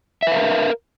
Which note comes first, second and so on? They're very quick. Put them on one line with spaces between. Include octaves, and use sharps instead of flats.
E5 B4 F5 A#4